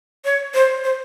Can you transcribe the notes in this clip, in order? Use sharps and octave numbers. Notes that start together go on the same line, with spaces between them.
C#5
C5
C5